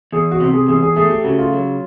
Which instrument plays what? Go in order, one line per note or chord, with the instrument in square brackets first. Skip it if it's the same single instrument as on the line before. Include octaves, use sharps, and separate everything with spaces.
[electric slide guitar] E2 [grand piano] G#4
[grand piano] F#4
[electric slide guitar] C3 [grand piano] G4
[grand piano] G#4
[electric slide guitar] E2 [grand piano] G#4
[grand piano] G#4
[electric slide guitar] A3 [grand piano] G#4
[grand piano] G4
[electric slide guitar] C#3 [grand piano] F#4
[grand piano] F4
[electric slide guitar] F#3